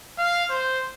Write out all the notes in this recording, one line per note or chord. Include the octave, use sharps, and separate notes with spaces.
F5
C5